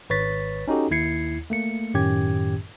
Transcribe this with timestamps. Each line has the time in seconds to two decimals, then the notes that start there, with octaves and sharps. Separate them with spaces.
0.10 G#1 B4 C#5 C#6 A6 B6
0.68 C#4 D#4 F#4 G4 A4
0.91 D#2 E4 G#6 C7 C#7
1.50 A3 A#3 C#7
1.94 F#2 A2 D#3 C#4 G4 G#6